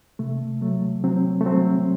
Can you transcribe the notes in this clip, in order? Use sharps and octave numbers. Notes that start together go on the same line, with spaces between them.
C3 A3
F#3 A3
F#3 C4
A3
F#3 C4